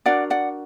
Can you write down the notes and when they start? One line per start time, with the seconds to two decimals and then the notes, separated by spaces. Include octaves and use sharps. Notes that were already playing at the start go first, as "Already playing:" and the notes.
0.06 D4 F#4 A#4 D5 F#5
0.30 D5 F#5